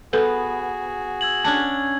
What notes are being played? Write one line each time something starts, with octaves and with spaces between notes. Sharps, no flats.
B3 F#4 G#4 A4 B4
E6 G#6 F#7
C#4 D4 F#5 A5 G#6